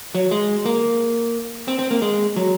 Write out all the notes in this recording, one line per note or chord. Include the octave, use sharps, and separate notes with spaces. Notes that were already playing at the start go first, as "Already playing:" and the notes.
F#3
G#3
A#3
C4
C4
A#3
G#3
F#3